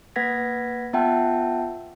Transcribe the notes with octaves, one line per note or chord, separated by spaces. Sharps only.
A#3 B4 F#5 G#6 A#6 B6
B3 F4 E5 F#5 G5 A5